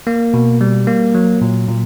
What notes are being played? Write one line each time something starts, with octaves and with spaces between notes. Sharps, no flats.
A#3
B2
G3
A#3
F#3
A#2
A#2